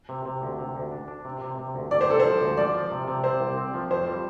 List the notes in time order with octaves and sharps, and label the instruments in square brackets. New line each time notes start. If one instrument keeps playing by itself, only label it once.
[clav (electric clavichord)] C3
C3
D2
C3
D2
D4
D4
C3
C3
C3
D2
[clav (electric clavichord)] D2 [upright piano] D5
[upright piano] C5
[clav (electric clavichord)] C3 [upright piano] A4
[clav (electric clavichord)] F3 [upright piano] C5
[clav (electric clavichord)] D2
[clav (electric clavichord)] F3 [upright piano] D5
[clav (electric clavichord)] F3
C3
C3
[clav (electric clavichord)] C4 [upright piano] C5
[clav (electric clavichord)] C2
C4
F3
[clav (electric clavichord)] F2 [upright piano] C5
[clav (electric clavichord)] G3